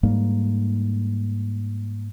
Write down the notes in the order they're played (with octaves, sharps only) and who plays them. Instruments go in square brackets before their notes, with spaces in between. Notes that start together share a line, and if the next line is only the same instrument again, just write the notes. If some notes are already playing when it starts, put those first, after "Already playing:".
[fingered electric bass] G#2 G3 A#3